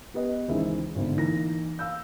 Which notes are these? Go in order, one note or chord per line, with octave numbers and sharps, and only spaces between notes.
B3 G4 B4 D#5
C#2 D#3 E3 G#3 C4 E5
G#1 B2 D3
E3 A#3 D#4 A#6
F5 E6 G6